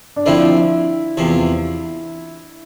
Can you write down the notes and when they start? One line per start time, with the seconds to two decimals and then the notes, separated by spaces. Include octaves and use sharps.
0.16 D4
0.26 D3 F3 C4 E4
1.17 E2 C3 F3